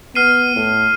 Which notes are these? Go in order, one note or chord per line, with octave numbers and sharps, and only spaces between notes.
B3 F6 C7 D#7
A2